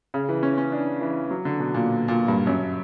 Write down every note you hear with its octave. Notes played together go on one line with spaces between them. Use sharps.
C#3
E3
C#4
C#4
D4
E3
F#3
D3
B2
A#2
A#2
G2
F#2